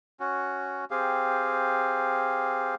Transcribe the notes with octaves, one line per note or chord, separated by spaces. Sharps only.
C#4 F#4
C4 G4 G#4 F5